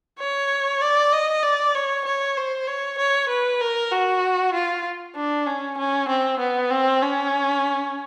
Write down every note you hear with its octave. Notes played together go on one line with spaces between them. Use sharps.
C#5
D5
D#5
D5
C#5
C#5
C5
C#5
C#5
B4
A#4
F#4
F4
D4
C#4
C#4
C4
B3
C4
C#4